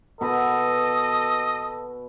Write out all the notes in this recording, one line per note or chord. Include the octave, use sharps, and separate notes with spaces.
B2 A4 B4 D#5